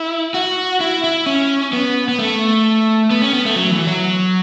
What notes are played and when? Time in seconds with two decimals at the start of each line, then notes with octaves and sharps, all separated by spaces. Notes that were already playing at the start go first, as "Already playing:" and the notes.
Already playing: E4
0.34 F#4
0.80 E4
1.04 E4
1.26 C#4
1.73 B3
2.08 B3
2.19 A3
3.11 B3
3.22 C#4
3.33 B3
3.45 A3
3.56 F#3
3.72 E3
3.87 F#3